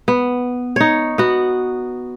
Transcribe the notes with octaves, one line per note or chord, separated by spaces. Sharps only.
B3
D#4 C#5
B3 F#4